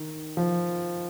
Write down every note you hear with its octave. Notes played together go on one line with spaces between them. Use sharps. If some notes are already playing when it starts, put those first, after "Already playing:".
Already playing: D#3
F3